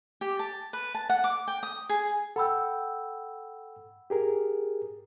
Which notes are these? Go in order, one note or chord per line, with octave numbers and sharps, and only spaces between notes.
G4
A5
B4
A5
F#5
D6
G5
D#6
G#4
A4 F#5 G5 B5 E6
G4 G#4 A#4